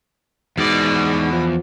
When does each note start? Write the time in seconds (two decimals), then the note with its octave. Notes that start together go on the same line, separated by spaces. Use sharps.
0.57 E2 G#2 B2 D5
1.32 F3